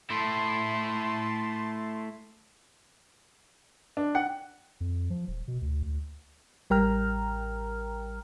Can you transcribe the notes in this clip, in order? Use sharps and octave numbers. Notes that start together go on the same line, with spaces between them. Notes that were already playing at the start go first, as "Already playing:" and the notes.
A3 E4 A5 C6
D4
F#5 G5
F2
F3
D#1
B2
D2
D2
A1 G3 A#4 G5 A#5 F6